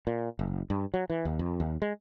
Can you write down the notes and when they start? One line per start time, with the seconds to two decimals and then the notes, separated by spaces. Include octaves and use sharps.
0.07 A#2
0.39 F#1
0.70 G2
0.94 F#3
1.10 E3
1.25 D#2
1.39 F2
1.60 D#2
1.82 G#3